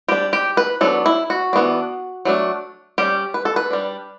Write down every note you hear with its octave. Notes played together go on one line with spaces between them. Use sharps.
G3 D4 G4
G4
B4
F#3 B3 D4 A4
E4
F#4
E3 B3 D4
F#3 A3 D4
G3 C#4 G4
B4
A4
B4
G3 D4